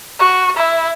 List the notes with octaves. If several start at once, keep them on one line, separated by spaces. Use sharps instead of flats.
F#4
E4